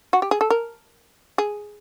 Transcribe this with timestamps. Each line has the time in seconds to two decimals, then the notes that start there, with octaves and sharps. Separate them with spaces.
0.13 F#4
0.22 G4
0.31 G#4
0.41 A4
0.50 A#4
1.38 G#4